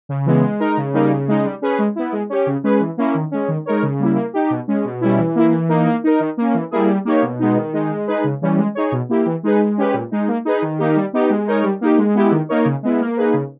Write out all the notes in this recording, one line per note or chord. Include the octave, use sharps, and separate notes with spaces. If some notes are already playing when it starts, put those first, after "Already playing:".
C#3
E3 G#3 B3
G#3
D#4 A#4
C#3
G3 A#3 D#4
C#3
G#3 D#4
G3
C#4 G#4 B4
G#3
B3 E4
G#3
C#4 G4 C#5
C#3
G#3 C#4 G#4 B4
E3
A#3 C#4 E4
D#3
G#3 C#4
D#3
G#3 D#4 A#4 C#5
C#3
G3 A#3 E4
A#3
D#4 G4
B2
G#3 C#4
B2
G3 C#4 E4
E3
A#3 E4
E3
A#3 D#4
A#3
D#4 A#4
D#3
A#3 C#4
E3
G3 A#3 E4 G#4
G3
A#3 D#4 G4 C#5
B2
G#3 B3 D#4
D#3
G#3 D#4
G#3
D#4 G#4 B4
C#3
E3 G3 C#4
G#3
D#4 G#4 C#5
B2
A#3 E4 G4
E3
G#3 D#4 G#4 B4
G#3
C#4 G4 B4
A#2
G#3 D#4
A#3
D#4 G#4 B4
D#3
A#3 D#4 G4
G3
B3 D#4 G4
G#3
D#4 A#4 C#5
G3
A#3 D#4 G4
G#3
B3 E4 G4
D#3
A#3 D#4 A#4 C#5
C#3
G#3 B3 E4
A#3
D#4 G#4 B4
C#3